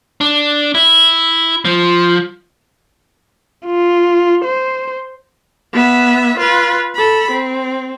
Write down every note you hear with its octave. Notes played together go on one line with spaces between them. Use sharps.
D4
E4
F3
F4
C5
B3 E5
F4 B4
A4 B5
C4